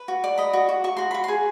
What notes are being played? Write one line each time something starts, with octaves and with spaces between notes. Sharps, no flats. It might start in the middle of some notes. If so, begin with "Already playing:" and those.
Already playing: B4
F#4
D5
D#5 B5
F#4
F#4
F#4 C#6
F#4 C6
F#4 B5
G#4 C6